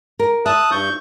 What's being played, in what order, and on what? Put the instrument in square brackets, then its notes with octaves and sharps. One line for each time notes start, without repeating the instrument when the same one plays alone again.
[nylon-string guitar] A#4
[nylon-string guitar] E5 [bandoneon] A5 D#6 F#6
[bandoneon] G2 C#6 G6